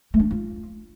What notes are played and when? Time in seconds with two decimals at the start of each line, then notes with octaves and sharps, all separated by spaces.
0.14 A3
0.19 D4
0.25 C4
0.31 F4